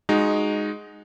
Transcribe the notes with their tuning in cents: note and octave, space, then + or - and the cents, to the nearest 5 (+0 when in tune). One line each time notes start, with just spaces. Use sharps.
G#3 +0 D#4 -10 F#4 +0